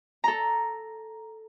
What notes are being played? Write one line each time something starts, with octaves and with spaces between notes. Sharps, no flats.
A4 A#5